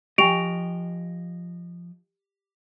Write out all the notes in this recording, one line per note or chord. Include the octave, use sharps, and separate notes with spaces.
F3 G4 D#5 G5 G#5 D7 F7